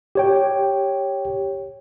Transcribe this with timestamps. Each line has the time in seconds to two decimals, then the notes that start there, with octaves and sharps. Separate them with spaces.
0.15 G4 C#5 G5